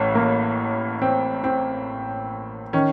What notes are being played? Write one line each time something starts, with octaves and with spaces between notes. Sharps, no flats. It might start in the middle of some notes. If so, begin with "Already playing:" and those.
Already playing: A1 A2
A#3
C4
C4
D#3 C#4